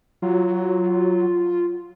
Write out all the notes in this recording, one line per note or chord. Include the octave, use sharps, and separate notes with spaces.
F#3 F4